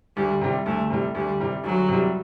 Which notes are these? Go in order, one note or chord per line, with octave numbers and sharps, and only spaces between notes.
D2 G3
C3 G3
D2 A3
C3 G3
D2 G3
C3 G3
D2 F#3
C3
G3